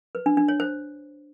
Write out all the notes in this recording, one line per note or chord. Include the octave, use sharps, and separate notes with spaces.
B4
D4
D4
C#5
C5